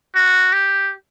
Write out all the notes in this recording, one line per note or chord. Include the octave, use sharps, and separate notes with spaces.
F#4
G4